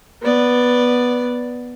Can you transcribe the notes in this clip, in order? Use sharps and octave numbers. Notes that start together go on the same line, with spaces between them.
B3 D5